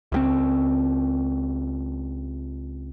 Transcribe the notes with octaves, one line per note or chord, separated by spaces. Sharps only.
C#2 F3 C4